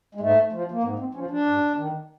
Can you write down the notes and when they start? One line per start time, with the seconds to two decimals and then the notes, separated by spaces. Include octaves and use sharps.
0.15 G#3
0.20 G#2 A3
0.52 F3
0.71 A#3
0.83 G#2 B3
0.99 C4
1.14 F3 C#4
1.31 D4
1.46 G2
1.77 D#3